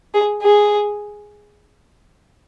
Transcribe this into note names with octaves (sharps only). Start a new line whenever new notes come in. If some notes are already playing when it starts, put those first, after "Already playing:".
G#4
G#4